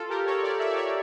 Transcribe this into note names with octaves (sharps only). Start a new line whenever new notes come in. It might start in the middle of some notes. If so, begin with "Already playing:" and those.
Already playing: F4 A4
G4 A#4
A4 C#5
A#4 D5
E5
D5
C#5 E5